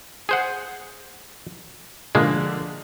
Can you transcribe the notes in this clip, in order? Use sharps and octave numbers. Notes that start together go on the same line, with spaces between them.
G#4 C5 F#5
D3 F3 G#3 A#3 D4